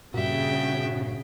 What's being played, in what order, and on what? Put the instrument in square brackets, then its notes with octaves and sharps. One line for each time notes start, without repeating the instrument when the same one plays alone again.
[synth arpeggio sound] G2 A#2 [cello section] C#3 [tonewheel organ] F#4 [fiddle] E5 G5